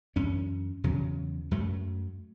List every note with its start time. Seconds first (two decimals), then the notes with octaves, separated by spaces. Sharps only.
0.16 F#2 E3 C#4
0.84 E2 C#3 F#3
1.51 F#2 F#3 A3